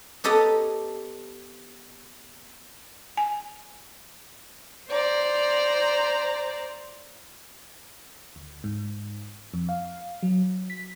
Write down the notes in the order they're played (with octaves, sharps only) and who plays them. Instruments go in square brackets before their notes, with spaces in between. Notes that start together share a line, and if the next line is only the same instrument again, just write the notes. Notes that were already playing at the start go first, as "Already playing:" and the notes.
[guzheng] B3 G4 A4 C#5 D#5 A#5
[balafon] G#5
[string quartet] C5 D5 A#5
[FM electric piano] D2
G#2
F2
F5
F#3
B6